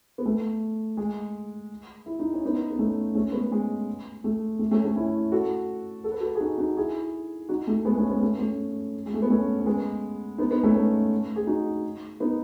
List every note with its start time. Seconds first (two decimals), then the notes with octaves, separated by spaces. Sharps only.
0.18 B3
0.26 A3
0.97 G#3
2.06 E4
2.19 D#4
2.33 C#4
2.45 B3 D#4
2.70 B3
2.79 A3 C#4
3.15 A3 C#4
3.32 G#3 B3
3.51 G#3 B3
4.24 A3
4.59 A3
4.71 A3 C#4
4.84 A3 C#4
4.96 C#4 E4
5.32 F#4 A4
6.04 A4
6.12 B4
6.20 F#4 A4
6.35 G#4
6.41 D#4 F#4
6.58 D#4 F#4
6.77 E4 G#4
7.49 D#4 F#4
7.67 A3
7.85 G#3 B3
7.98 A3 C#4
8.09 G#3 B3
8.22 A3
8.39 A3 C#4
9.06 G#3
9.14 A3
9.22 B3
9.30 A3 C#4
9.59 C#4
9.66 G#3 B3
10.38 B3 D#4
10.51 B3 D#4
10.63 A3 C#4
10.74 G#3 B3
11.36 G#4
11.47 D#4 F#4
12.20 B3 D#4